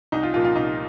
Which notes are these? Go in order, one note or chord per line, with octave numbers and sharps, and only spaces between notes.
C2 D#4
F4
A#2 F3 F4
F4
C2 D#4